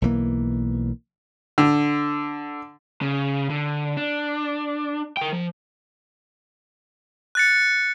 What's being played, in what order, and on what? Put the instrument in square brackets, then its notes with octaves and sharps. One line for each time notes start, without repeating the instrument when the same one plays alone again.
[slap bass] B1 E3 A#3
[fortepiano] D3
[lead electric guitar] C#3
D3
D4
A#4 G5
F3
[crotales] F#6 A6 C#7